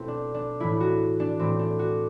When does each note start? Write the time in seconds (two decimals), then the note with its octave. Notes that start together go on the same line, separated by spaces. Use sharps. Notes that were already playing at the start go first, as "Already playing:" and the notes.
Already playing: B2 A3 C4 E4
0.08 D4
0.34 D4
0.60 A2 E3 A3 E4
0.80 F#4
1.20 D4
1.40 A2 E3 A3 C4
1.59 D4
1.79 F#4